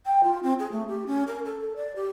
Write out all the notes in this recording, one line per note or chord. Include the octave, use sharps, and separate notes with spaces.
G5
F4
C4
G#4
A3
G4
C#4
A#4
A4
A4
D5
G4